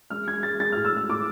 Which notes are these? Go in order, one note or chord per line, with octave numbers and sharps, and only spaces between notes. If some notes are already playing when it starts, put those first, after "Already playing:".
G#3 F6
G#3 G#6
G#3 A6
G#3 A6
F6
A2
E6
G#3 F6
A2 D6